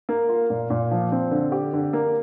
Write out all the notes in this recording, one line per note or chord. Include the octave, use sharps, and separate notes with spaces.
A#3
F4
A#2
A#2
F3
C4
D3
G4
D3
A#3